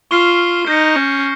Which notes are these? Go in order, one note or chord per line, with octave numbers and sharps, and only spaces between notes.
F4 C#6 F6 C7 G7
D#4 G6 A#6 C#7
C#4